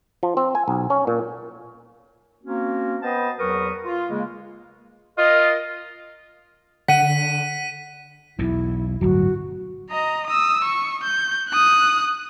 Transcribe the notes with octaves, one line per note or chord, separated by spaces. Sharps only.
F3
C4
G#5
B1
C#4
A#2
A#3 C4 C#4 F#4
B3 B4 C5 D#5 G5 A5
E2 F#3 A#4 B4 C#6 D#6
F4
C#3 G#3 A#3
F4 A#4 D#5
D3 F#5 B6 D#7
B1 E2 E4
D1 G1 F#3 F#4
D#5 A#5
D#6 E6
C#6
G6
D#6 F#6